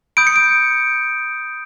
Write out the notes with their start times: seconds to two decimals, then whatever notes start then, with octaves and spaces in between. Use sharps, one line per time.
0.17 B5 D#6 G6 D7
0.27 C#7
0.36 D7